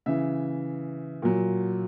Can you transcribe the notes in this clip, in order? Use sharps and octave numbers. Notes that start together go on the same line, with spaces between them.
C#3 E3 E5
A#2 F#3